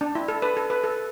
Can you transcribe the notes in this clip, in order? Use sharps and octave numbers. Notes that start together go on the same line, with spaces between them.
D4
E4
A4
B4
A4
B4
A4